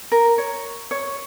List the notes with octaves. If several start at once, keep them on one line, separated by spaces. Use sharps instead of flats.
A#4
C#5
C#5